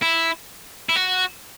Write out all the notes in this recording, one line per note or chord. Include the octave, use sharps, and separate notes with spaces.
E4
E4
F#4